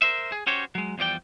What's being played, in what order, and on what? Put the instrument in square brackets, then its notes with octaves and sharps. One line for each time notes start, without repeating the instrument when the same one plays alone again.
[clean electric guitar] A#4 C5 E5
G#4
C#4 F#4 G4 C5 C#5
F#3 G#3
E2 F3 G3 D5 G5